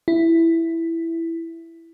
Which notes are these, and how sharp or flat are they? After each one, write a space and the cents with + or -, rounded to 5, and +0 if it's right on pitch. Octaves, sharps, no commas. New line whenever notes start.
E4 +5